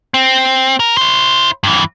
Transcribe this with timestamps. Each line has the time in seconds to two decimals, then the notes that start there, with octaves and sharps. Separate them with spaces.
0.14 C4
0.80 A#4
0.97 E4 C5
1.64 G2 E3